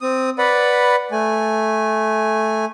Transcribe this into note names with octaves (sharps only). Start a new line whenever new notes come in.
C4 D#6
B4 D5 F#5 B5
A3 G#5